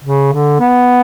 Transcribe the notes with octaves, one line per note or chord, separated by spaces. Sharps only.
C#3
D3
B3